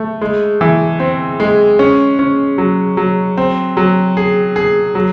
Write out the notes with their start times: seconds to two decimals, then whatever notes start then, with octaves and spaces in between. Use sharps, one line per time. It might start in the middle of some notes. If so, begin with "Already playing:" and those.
Already playing: A3
0.22 G#3
0.61 E3
1.00 C4
1.40 G#3
1.79 C#4
2.19 C#4
2.58 F#3
2.97 F#3
3.37 C4
3.77 F#3
4.17 G#4
4.56 G#4
4.95 F#3